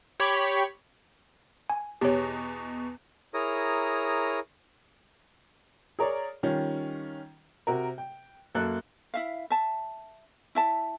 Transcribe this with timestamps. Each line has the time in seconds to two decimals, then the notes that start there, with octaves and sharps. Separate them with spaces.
0.20 G4 C#5 B5
1.70 G#5
2.01 E2 B2 G4 C#5
3.34 E4 G#4 A#4 C#5 A#5 D#6
5.99 G#4 A#4 C#5 D5
6.43 D#3 G3 C#4 F4
7.67 C3 F#4 A#4
7.98 G5
8.55 F#2 A#3 A4 F#6
9.14 E4 E5 F5
9.50 E5 A5
10.55 E4 E5 A5